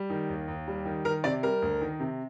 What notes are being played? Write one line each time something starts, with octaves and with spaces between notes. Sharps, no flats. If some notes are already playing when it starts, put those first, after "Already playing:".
Already playing: G3
D#3
D#2
D#2
G3
D#3
D#3 A#4
C3 D5
G3 A#4
D2
D#3
C3